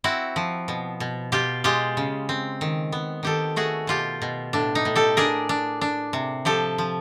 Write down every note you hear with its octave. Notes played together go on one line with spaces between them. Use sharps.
C4 E4 F#4
F3
B2
B2
B2 F4 G4
G#3 F4 G4
C#3
C4
D#3
B3
D#3 G4 A4
A3 F#4 G#4
B2 F4 G4
B2
A2 D4
D#4
A2
G4 A4
D4 G#4 A#4
D4
D4
C3
F3 G4 A4
F3